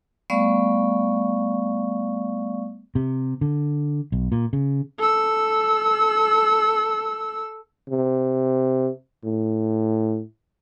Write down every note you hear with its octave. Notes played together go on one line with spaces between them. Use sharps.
G3 A3 B3 D5 F5 C#6
C3
D3
B1
A#2
C#3
A4 E6
C3
A2